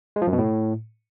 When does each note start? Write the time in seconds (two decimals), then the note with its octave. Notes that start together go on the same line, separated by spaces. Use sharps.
0.16 G#3
0.22 F3
0.27 F#2
0.33 B2
0.38 A2